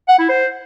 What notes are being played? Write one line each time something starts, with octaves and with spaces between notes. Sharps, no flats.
F#5
E4
C5